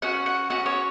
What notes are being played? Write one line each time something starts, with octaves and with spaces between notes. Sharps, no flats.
C#4 F#4 F#5
F#5
C#4 F#4 F#5
C#5